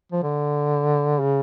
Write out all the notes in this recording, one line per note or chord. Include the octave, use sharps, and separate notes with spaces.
F3
D3
C#3